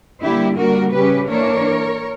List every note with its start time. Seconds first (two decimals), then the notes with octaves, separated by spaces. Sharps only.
0.21 D3 G3 A#3 E4 G4
0.57 D3 G3 A#3 F#4 A#4
0.93 C#3 G3 C#4 G4 B4
1.28 E3 A#3 D4 A#4 C#5